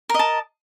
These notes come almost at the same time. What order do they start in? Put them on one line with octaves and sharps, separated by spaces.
A#4 D#5 A5